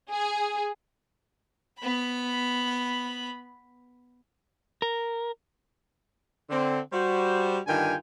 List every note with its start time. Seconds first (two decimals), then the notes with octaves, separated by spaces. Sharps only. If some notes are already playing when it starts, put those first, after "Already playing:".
0.10 G#4
1.79 B3 B5
4.82 A#4
6.50 D3 C4
6.92 G3 F#4 C5
7.67 G2 D3 D#3 F4 G5 G#5